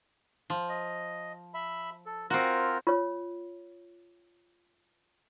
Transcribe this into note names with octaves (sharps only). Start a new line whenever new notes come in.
F3
D#5
E5 B5
A4
C4 F4 F#4 A#4
F4 C#5